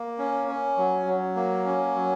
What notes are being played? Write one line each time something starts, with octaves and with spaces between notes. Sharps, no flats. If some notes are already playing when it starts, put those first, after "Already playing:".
Already playing: A#3
C#4
C#4
F#3
F#3
A#3
C#4
F#3